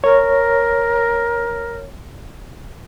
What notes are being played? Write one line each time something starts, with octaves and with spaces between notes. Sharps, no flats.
A#4 C#5